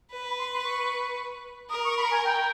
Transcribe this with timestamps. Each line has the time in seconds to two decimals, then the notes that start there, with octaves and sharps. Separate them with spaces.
0.12 B4
0.25 B5
0.39 C6
0.52 C6
0.64 C#6
1.70 A#4 D#6
1.84 C#6
1.97 B5
2.11 G#5
2.24 G5